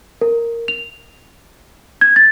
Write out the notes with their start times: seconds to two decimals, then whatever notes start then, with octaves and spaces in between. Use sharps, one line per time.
0.21 A#4
0.68 F7
2.01 G#6
2.16 A6